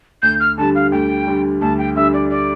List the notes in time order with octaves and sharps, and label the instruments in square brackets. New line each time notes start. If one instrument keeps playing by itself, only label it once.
[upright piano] D2 [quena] G6
[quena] F6
[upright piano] D3 G3 [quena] A5
[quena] F5
[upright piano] D2 [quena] G5
[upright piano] D3 G3
[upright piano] D2 [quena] A5
[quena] G5
[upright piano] D3 G3 [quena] E5
[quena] D5
D5